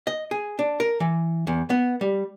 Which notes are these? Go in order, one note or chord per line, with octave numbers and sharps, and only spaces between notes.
D#5
G#4
D4
A#4
E3
E2
B3
G3